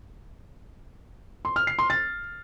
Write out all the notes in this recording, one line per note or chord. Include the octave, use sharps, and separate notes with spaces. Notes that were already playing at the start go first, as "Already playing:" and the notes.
C6
F6
C7
C6
A6